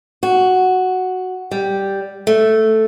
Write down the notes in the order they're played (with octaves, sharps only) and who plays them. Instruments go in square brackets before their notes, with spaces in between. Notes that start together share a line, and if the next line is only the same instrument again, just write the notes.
[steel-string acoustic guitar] F#4
G3
A3